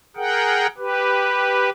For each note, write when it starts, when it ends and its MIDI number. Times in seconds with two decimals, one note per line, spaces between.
0.16 0.67 68
0.16 0.67 70
0.16 0.67 78
0.16 0.67 79
0.78 1.70 67
0.78 1.70 71